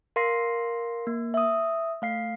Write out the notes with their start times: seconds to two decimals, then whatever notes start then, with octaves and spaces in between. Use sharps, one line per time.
0.16 A#4 F5 C6 A#6 C7
1.07 A#3
1.34 E5 D#6
2.02 A3 F5 C7